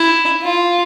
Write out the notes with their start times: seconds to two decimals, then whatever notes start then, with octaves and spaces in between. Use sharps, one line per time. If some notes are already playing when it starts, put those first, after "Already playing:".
Already playing: E4
0.43 F4